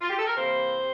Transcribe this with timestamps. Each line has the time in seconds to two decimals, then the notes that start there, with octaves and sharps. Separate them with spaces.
0.01 F4
0.10 G4
0.19 A4
0.27 A#4
0.35 C3 E3 A#3 E4 C5
0.77 C3